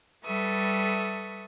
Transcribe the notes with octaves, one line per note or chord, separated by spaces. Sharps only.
G3 A4 B4 E5 C#6 D#6